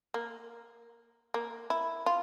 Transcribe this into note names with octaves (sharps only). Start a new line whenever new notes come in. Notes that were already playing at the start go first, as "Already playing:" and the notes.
A#3
A#3
E4
F4